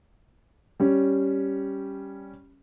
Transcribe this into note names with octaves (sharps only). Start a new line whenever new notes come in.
G3 C#4